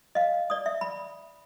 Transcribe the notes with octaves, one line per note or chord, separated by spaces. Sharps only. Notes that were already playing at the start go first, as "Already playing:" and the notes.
D#5 F5
D5 D#6
E5
B5